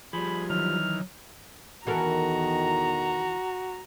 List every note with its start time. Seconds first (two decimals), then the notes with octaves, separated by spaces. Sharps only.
0.13 F3 G3 G#4 B5
0.50 D#3 E3 F#3 F6
1.87 E2 B2 D#3 E3 F#4 A4 A#4 A#5